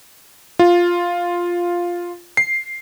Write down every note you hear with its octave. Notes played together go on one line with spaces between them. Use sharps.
F4
C7